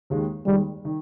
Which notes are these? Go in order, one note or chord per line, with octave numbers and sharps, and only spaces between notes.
D#2 D#3 G#3
D#2 D#3 G3 G#3
D#3